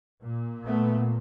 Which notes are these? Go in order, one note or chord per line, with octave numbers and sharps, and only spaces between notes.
A#2
A3 B3